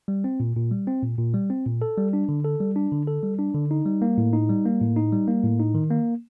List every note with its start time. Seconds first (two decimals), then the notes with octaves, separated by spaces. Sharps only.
0.08 G3
0.24 C4
0.40 A#2
0.56 A#2
0.71 G3
0.87 C4
1.03 A#2
1.18 A#2
1.34 G3
1.50 C4
1.66 A#2
1.82 A4
1.98 G3
2.13 D4
2.29 D3
2.44 A4
2.60 G3
2.76 D4
2.92 D3
3.07 A4
3.23 G3
3.39 D4
3.55 D3
3.71 D#4
3.86 G3
4.02 A#3
4.18 A2
4.33 D#4
4.49 G3
4.65 A#3
4.81 A2
4.96 D#4
5.13 G3
5.28 A#3
5.43 A2
5.60 D#4
5.75 D#3
5.91 A#3